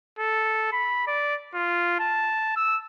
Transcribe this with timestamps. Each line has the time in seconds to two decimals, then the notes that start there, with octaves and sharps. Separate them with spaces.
0.19 A4
0.73 B5
1.07 D5
1.54 F4
2.00 A5
2.57 E6